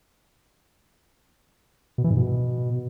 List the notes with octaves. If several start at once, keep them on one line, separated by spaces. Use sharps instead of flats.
B2
E3
G#2
B2